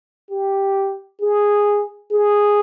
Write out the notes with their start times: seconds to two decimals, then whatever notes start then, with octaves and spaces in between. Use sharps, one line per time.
0.30 G4
1.21 G#4
2.11 G#4